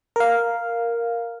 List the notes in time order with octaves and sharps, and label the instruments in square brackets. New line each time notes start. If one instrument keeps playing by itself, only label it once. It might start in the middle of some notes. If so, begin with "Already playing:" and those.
[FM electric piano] A#4 F5